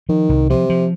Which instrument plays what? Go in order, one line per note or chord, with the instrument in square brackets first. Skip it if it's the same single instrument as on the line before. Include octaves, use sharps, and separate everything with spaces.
[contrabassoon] D#3 [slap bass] F3
[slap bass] C2
[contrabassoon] C3 [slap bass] F3
[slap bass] F3